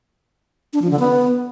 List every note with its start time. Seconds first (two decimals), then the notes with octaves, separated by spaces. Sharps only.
0.73 D4
0.82 F3
0.91 D3
0.99 B3